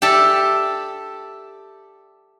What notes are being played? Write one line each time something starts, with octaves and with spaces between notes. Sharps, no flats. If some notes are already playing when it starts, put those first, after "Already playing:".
G4 A4 D5 E5